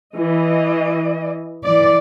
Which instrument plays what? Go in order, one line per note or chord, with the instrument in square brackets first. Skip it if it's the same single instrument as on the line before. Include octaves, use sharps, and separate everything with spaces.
[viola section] E3 D#5
[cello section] E3 D5